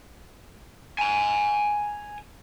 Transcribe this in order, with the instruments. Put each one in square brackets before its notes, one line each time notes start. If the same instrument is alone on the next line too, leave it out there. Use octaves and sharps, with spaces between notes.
[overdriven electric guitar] G#5 A#5